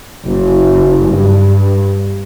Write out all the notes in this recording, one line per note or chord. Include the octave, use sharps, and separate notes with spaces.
F#1
G2